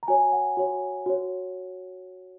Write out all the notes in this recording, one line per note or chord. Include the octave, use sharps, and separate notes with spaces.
A#5
F#4 C#5 G#5
F#5
F#4 C#5
F#4 C#5